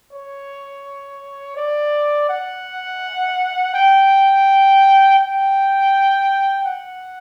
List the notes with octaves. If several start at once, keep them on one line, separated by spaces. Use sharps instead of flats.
C#5
D5
F#5
G5
G5
F#5